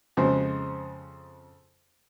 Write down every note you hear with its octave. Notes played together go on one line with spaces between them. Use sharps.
F2 C#3 G#3 C5